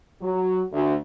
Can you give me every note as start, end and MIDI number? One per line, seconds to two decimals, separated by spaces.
0.22 0.63 54
0.72 0.94 38